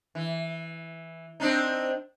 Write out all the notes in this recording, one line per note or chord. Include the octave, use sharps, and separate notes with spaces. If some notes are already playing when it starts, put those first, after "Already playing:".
E3
C4 D4 D#4